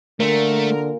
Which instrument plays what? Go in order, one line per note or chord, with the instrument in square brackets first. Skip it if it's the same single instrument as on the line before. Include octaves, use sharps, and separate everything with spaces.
[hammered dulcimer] A#2 C6 [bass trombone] D3 [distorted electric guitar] A3 [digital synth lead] A#4